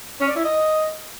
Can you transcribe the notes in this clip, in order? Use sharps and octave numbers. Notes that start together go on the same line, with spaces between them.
C#4
D5
E4
D#5